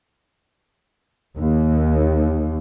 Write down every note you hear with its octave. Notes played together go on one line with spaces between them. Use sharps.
D#2